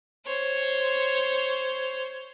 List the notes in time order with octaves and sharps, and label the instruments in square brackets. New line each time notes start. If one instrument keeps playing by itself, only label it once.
[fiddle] C5 C#5